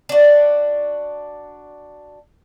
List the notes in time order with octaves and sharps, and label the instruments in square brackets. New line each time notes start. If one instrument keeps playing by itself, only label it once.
[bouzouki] D4 F#4